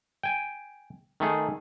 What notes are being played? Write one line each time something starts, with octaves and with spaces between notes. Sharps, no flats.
G5 G#5
D#3 A3 G#4